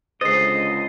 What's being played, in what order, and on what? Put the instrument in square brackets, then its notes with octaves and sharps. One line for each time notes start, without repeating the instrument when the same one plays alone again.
[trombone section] C#2 D3 [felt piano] G#3 C5 [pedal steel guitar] D#5 [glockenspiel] A6 C7